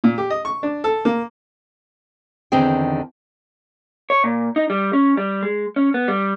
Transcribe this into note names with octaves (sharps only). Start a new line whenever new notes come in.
A#2
G4
D#5
C#6
D4
A4
A#3
E2 D3 D#3 C4 G#4 G5
C#5
A#2
D#4
G3
C#4
G3
G#3
C#4
B3
G3